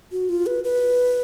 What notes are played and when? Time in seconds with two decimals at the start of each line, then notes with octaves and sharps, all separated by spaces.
0.12 F#4
0.29 F4
0.46 B4
0.64 B4